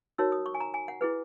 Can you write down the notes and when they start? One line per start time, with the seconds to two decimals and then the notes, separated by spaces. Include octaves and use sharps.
0.18 D#4 F#4 A#4 C#5 E6
0.32 D#6
0.46 C#6
0.54 G#5
0.60 A#5
0.74 G#5
0.88 F#5
1.01 E4 G#4 B4